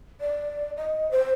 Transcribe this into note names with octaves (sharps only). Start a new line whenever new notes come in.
D5
D#5
C5